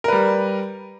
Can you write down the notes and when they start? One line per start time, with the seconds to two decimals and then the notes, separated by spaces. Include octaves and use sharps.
0.04 A#4
0.08 B4
0.12 G3